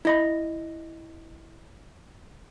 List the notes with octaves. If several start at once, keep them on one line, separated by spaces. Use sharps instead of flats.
E4 D#5 B5